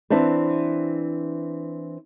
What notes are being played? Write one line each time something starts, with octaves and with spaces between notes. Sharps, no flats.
E3 C4 D4 C5